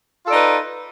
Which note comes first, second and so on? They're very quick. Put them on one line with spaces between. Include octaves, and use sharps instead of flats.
F4 A4 D5 D#4 B4